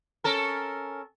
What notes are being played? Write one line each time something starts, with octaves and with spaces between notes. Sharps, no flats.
C#4 A4 A#4